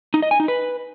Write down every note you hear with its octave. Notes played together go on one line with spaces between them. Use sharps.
D#4
D#5
G#5
D#4
B4